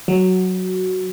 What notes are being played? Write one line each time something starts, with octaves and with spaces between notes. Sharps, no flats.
F#3